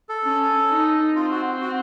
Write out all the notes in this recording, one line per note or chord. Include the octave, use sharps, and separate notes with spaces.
A4
C#4
D#4
C4 F4
F#4
F#4